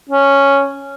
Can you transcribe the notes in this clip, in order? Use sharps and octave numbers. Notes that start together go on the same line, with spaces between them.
C#4